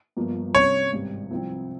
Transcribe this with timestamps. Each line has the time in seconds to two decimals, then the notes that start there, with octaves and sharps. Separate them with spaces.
0.17 G1 G2 F3 A#3
0.55 C2 C3 G3 C#4 C#5
0.92 G#1 G2 G3
1.31 C2 C3 F3 C4